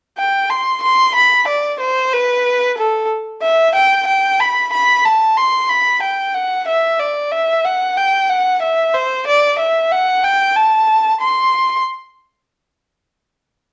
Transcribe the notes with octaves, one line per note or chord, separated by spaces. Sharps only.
G5
C6
C6
B5
D5
C5
B4
A4
E5
G5
G5
B5
B5
A5
C6
B5
G5
F#5
E5
D5
E5
F#5
G5
F#5
E5
C5
D5
E5
F#5
G5
A5
C6